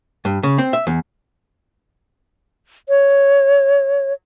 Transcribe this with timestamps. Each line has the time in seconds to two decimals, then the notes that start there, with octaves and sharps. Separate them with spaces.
0.25 G2
0.43 C#3
0.58 C4
0.73 E5
0.87 E2
2.89 C#5